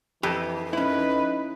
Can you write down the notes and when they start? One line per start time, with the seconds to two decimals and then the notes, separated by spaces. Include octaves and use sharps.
0.23 F2 E3 G4 A4
0.73 C#4 D#4 E4 B4